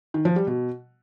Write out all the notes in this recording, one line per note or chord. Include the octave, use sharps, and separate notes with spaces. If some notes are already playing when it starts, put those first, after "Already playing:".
D#3
F3
G3
B2